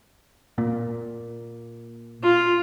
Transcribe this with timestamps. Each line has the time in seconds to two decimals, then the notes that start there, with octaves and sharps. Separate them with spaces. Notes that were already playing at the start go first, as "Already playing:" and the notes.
0.58 A#2
2.23 F4